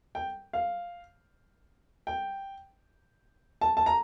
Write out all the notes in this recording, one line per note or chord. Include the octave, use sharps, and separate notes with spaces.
G5
F5
G5
A5
A5
A#5